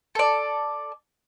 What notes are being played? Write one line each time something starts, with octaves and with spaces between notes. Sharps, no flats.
A4 D5